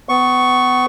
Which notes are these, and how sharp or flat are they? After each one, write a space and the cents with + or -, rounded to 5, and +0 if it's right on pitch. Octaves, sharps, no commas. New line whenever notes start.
B3 +30 C#6 +0